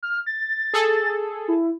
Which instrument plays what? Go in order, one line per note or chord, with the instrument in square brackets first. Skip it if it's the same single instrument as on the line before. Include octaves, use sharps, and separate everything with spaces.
[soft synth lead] F6
A6
[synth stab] G#4 A4
[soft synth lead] E4